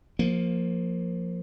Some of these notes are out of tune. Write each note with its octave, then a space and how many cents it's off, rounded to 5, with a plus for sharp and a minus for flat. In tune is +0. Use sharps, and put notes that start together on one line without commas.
F3 +15 A#3 +0